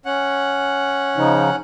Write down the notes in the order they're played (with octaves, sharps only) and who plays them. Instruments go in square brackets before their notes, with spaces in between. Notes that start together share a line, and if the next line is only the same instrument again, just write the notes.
[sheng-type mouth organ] C#4 F#5
[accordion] C#3 F3 D#4